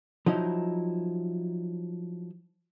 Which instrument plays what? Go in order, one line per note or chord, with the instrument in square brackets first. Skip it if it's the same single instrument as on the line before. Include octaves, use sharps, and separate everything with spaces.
[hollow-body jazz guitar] F3 F#3 D#4 E4